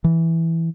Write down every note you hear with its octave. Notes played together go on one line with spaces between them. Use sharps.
E3